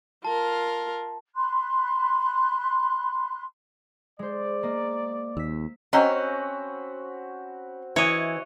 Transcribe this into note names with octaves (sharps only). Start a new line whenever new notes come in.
F4 A#4 A5
B5 C6 F#6
G#3 C5 D5
A#3 D#5
D#2 E6 B6
C4 C#4 F#4 D#5 A#5 B5
E3 C#5 D#5